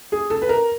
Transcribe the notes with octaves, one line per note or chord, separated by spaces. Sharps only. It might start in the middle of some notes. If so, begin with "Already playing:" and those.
G#4
A4
B4
A#4